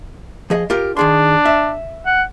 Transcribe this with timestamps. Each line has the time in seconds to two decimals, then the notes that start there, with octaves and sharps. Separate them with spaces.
0.50 F3 G#4 D#5
0.70 F4 G4 A#4
0.97 D#3 D4 G#4 C6
1.45 E5
2.06 F#5